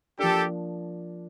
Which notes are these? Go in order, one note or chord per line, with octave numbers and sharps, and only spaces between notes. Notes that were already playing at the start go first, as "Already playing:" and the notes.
F3 A#3 D4 G4 A4